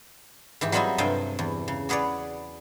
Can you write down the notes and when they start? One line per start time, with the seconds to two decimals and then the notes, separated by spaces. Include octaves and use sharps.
0.61 G#2 E3 G4
0.72 F#3 G3 C4 F4 D#5 G#5
0.98 G2 C3 A4 F5 G5 G#5
1.39 E2
1.68 C#3
1.89 F#4 G#4 B4 C#5 D5